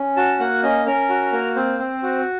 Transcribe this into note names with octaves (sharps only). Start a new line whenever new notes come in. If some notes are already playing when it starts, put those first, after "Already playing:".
Already playing: C#4
F#4 A5
A#3 F#5
C#4 D#5
C#4 A#4
F#4
A#3
C4 C5
C4
F#4